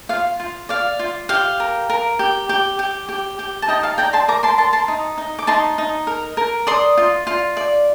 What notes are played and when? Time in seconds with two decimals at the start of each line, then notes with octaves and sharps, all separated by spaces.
0.09 F4 F5
0.40 F4
0.69 D5 F5
0.99 F4
1.29 G4 F5
1.60 A#4
1.90 A#4
2.19 G4
2.49 G4
2.79 G4
3.09 G4
3.39 G4
3.62 A5
3.68 D#4 D#5 G5
3.83 F5 A5
3.98 D5 G5 A#5
4.13 A5 C6
4.28 A#4 A#5 D6
4.43 A5 C6
4.58 A#4 A5 C6
4.73 A5 C6
4.88 D#4
5.18 D#4
5.39 D6
5.47 D#4 A5 C6
5.78 D#4
6.07 A#4
6.37 A#4
6.67 D5 C6 D#6
6.97 F4
7.27 F4
7.57 D5